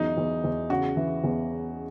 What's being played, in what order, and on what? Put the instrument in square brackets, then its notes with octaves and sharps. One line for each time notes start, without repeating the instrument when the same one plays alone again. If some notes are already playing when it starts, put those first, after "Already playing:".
Already playing: [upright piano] E2 F#3 [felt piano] D#4
[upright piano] E2
E2
[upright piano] C#3 [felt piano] F#4
[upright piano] E3
E2